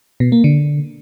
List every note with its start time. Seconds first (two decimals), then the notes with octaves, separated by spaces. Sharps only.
0.20 B2
0.32 A#3
0.44 D3